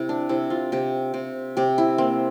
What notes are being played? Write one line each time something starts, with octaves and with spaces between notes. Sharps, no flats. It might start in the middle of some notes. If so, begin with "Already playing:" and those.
Already playing: C3 E4
D4
C3 E4
F4
C3 G4
C3
C3 G4
E4
A#3 C4